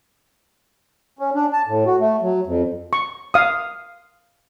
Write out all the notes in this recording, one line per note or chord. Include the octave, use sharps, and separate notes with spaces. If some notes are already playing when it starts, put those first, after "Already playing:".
C#4
D4
A5
A2
F#4
A3
F#3
F2
C#6
F5 D#6